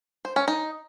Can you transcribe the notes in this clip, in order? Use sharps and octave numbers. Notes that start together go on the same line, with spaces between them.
C5
C#4
D#4